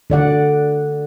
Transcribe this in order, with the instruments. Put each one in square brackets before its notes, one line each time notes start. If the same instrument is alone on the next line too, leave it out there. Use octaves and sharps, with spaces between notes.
[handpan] D3 D5 F#5